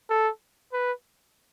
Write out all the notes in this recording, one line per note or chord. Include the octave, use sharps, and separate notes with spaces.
A4
B4